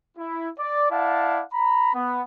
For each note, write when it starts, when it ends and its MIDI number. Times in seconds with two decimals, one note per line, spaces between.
0.17 0.49 64
0.59 0.90 74
0.91 1.42 64
0.91 1.42 74
0.91 1.42 77
0.91 1.42 78
0.91 1.42 81
1.53 1.92 82
1.53 1.92 83
1.94 2.22 59